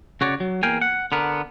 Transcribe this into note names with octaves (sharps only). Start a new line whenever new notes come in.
C#3 F#4 C#5 D5
F#3
E2 A#3 F5 G5 G#5
F#5
D3 B3 A#4